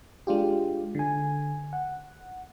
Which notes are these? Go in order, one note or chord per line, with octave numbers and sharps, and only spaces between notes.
G#3 D4 F4 G4
D3 G#5
F#5